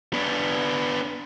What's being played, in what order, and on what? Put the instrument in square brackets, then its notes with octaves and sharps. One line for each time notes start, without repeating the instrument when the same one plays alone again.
[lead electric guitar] B3 D4